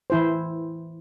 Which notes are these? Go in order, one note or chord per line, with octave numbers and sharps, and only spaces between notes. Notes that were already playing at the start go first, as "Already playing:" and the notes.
E3 E4 C5